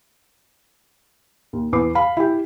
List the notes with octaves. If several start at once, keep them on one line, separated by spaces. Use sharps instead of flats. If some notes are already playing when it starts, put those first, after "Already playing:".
D#2
E2 B4 D6 C7
F5 B5
E4 G4